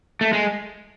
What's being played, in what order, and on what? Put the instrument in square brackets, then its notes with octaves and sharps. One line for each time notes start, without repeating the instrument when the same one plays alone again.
[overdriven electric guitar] A3
G#3